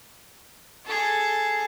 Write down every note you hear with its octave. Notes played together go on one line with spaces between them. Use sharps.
G#4 A4